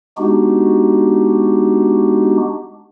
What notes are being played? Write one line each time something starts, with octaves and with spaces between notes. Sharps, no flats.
G#3 B3 D4 D#4 F#4 G4